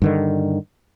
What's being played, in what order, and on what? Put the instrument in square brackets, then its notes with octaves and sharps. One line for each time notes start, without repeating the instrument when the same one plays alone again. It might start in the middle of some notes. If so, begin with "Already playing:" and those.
[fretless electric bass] G2 D3 D#3